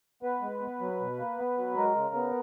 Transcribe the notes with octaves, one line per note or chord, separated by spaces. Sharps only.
B3 B4
G#3
B3
F#3
B2
A#3
B3
F#3
G#3 A#4
C#3
B3